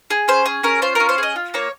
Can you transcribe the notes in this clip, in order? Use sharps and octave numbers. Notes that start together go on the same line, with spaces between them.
G#4
C#4 C5
G#4
C#4 A#4
F4 C5
C#4 A#4
C5
G#4 D#5
F4
A#3 C#5